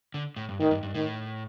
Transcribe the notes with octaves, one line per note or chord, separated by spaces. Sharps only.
D3
A2
G2
A2 D#3
G2
G2
A2 D#3